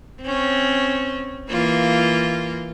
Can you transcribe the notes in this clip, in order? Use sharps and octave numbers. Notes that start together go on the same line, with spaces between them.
C4 C#4
E3 A#3 F4